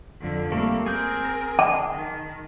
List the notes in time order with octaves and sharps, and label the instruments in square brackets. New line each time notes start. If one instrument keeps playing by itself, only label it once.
[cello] F2 D3
[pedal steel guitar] G3 A3 A#3 [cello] C4
[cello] C4 A#4 [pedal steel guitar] G#4 G6
[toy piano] A5
[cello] D#3